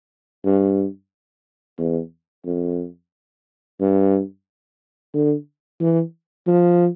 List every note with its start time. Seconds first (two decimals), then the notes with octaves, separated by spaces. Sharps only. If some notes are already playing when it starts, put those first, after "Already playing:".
0.45 G2
1.79 E2
2.46 F2
3.80 G2
5.14 D3
5.81 E3
6.47 F3